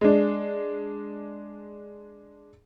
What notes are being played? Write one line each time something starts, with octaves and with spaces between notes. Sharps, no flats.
G#3 D4